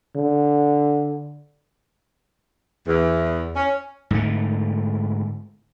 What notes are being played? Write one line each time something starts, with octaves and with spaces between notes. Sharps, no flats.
D3
E2
C#4
G#2 D3 A3